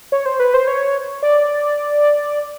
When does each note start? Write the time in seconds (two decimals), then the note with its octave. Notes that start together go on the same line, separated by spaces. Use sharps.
0.12 C#5
0.26 C5
0.40 B4
0.54 C5
0.68 C#5
1.23 D5